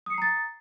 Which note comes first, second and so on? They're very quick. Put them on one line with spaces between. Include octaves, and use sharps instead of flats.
D#6 C#7 C7 A#5 A6